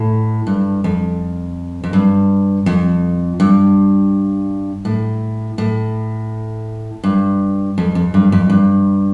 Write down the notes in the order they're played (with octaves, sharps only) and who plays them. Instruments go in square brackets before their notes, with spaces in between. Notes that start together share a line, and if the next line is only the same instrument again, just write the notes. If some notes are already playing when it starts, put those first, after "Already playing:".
Already playing: [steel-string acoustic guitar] A2
G2
F2
F2
G2
F2
G2
A2
A2
G2
F2
F2
G2
F2
G2